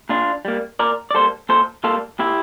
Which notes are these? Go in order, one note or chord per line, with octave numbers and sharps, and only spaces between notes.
A#2 D4 F4
G3 A#3
A#2 A#4 D5
D5
G3 A#3 A4 C5
A#2 A4 C5
G3 A#3 F4 A4
A#2 E4 G4